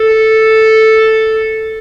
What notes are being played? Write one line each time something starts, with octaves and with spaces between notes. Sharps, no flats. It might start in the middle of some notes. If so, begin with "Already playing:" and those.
Already playing: A4